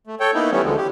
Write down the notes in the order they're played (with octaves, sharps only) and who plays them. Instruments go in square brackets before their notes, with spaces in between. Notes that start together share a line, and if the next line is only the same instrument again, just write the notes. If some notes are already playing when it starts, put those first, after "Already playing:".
[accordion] A3
A4 C#5 G5
A#3 B3 D#4 E4
E3 G3 A3 B3 C#4
D2 D3 F3 G#3
G4